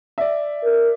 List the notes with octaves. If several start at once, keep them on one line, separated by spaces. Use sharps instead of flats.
D5 E5
A#4